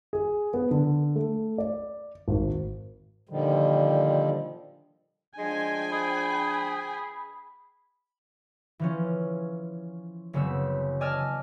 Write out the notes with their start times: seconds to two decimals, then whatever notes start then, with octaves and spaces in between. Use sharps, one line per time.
0.13 G#4
0.54 B3
0.71 D3
1.15 A3
1.58 D5
2.28 G#1
3.29 A#2 D3 D#3 F3 G3
5.38 F3 G#3 D4 G5 G#5
5.92 G#4 B5
8.79 E3 F3 C#4
10.33 F#1 C#3 B3 C4 E6
11.01 D5 D#5 G#5 A5 E6 F6